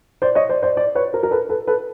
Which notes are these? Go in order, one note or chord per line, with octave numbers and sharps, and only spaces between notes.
C5 D5
C#5 D#5
C5 D5
C5 D5
C5 D5
B4 C#5
A#4 C5
A#4
A4 B4
A4 B4
A4 B4